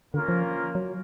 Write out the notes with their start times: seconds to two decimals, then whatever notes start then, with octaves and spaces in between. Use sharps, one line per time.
0.14 D3 A#3 C#4 F4 A#4
0.28 F3
0.75 F#3